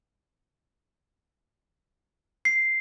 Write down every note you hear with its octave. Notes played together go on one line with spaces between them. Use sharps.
C7